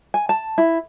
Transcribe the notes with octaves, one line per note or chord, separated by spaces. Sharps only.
G#5
A5
E4